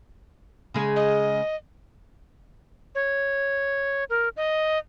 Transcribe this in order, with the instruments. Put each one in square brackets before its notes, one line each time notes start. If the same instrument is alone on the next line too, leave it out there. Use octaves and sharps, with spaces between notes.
[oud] C#3 G#3 G#4
[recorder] D#5
C#5
A#4
D#5